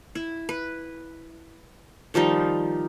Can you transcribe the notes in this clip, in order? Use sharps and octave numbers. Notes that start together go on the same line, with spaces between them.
E4
B4
D#3 F3 G3 D#4